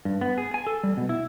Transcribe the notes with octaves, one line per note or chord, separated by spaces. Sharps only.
G2
B3
G#4
G#5
A4
G3
B2
E4